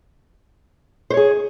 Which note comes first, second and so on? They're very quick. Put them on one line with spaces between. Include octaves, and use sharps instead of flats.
C5 C#5 G#4